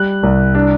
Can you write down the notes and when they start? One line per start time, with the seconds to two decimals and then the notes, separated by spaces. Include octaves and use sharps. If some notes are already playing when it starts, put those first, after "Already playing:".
Already playing: G3 F#6
0.23 C2
0.55 D4